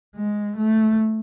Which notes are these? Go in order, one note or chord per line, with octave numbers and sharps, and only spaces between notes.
G#3
A3